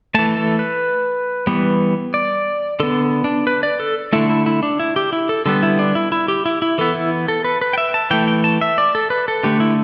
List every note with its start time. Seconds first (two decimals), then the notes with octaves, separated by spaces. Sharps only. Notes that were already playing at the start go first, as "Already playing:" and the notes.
0.14 E3 A3 A5
0.37 A4
0.59 B4
1.47 E3 G3 B3
2.14 D5
2.80 D3 B3 A4
3.24 D4
3.47 B4
3.63 D5
3.80 A4
4.13 D3 A3 E4
4.29 E4
4.46 E4
4.63 D4
4.80 E4
4.96 G4
5.13 E4
5.29 A4
5.46 D3 G3 B3 A4
5.63 E4
5.79 D4
5.95 E4
6.12 E4
6.28 G4
6.46 E4
6.62 E4
6.78 E3 B3 A4
6.95 E4
7.28 A4
7.45 B4
7.61 B4
7.73 G5
7.78 E5
7.94 A5
8.11 E3 A3 G5
8.28 G5
8.44 A5
8.61 E5
8.78 D5
8.95 A4
9.10 B4
9.28 A4
9.43 D3 A3 G4
9.60 E4